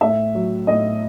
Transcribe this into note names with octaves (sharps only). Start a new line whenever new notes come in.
A2 E5
F#3
A2 D#5